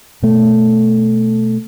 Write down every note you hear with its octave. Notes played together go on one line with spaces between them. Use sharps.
B2 A3